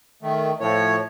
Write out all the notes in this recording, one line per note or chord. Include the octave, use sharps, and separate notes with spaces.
D#3 A3
A2 F3 C#5